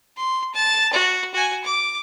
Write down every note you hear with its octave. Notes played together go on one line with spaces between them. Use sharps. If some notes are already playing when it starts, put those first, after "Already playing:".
C6
A5
F#4
F#4 G#5
D6